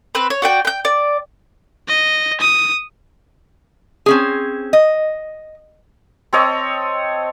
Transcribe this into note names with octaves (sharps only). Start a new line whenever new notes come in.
C4 B4
C#5
F#4 D5 G5
G5 G6
D5
D#5
D#6
C4 C#4 G#4
D#5
C4 A4 C#5 D#5